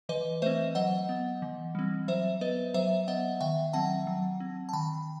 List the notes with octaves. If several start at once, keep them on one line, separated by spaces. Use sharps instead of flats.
E3 B4 D#5
A3 C4 C5 E5
F#3 D#5 F#5
B3
E3
G3 C4
F#3 C5 E5
B3 B4 D#5
F#3 C5 E5
B3 D#5 F#5
D#3 E5 G5
F#3 C4 F#5 A5
F#3
C4
A5
D#3 G5 B5